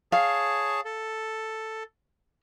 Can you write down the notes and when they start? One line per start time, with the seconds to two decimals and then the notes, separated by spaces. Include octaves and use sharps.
0.12 G#4 C#5 F5 A5
0.85 A4